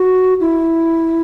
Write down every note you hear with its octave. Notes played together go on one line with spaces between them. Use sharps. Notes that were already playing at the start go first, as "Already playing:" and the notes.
Already playing: F#4
E4